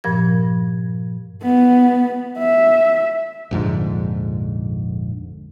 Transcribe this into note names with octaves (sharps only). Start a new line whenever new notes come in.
G2 A#2 F3 A#4 G#6
B3
E5
A#1 F2 G#2 D3